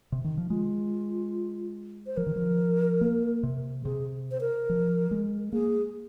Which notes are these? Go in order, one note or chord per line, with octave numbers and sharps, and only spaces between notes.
C3
D#3
F3
G#3 F4
C5
F3 A#4
D#3
F3
A#3
C3
C3 G#4
C5
A#4
F3
G#3
A#3 G#4